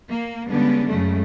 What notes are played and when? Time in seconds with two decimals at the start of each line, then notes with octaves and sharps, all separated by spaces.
0.10 A#3
0.49 D3 G3 G#3 B3 C#4 D4
0.88 F#2 C#3 F#3 G#3 A3